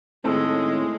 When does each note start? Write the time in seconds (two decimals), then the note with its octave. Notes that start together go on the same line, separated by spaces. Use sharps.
0.24 A2 D#3 G#3 C4 C#4 A4